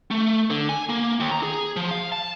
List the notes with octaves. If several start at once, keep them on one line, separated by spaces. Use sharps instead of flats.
A3
D3
G#5
A#3
D#2
A#5
G#4
F3
F5
A5